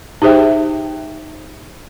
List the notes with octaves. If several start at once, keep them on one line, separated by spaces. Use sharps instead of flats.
D#4 G4 G#4 C5 E5 G5